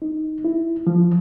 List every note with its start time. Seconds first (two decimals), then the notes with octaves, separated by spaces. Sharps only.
0.02 D#4
0.45 E4
0.87 F3